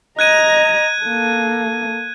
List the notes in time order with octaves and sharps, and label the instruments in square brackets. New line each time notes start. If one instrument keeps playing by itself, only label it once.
[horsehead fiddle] D#5 A#5 [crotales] F#6 G#6 D#7
[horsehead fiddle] A#3 A4